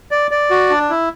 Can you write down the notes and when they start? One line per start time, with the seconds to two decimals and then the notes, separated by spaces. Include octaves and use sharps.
0.11 D5
0.31 D5
0.50 F#4
0.70 D4
0.90 E4